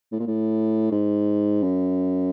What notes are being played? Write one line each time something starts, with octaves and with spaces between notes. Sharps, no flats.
A2
A#2
A2
G#2
F#2